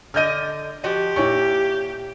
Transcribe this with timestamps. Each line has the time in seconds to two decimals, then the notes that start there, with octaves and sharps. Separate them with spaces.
0.14 D3 D#5 F6 G6 D#7
0.84 F3 F#4 G4 D#5
1.16 A#2 E4 C#5 C#6